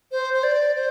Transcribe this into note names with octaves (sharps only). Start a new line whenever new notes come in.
C5
C5
D5
C5